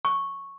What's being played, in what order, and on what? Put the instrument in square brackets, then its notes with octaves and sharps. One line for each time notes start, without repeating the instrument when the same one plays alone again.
[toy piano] C#6